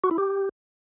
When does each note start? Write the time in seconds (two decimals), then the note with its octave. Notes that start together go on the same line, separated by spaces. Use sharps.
0.04 F#4
0.11 E4
0.18 G4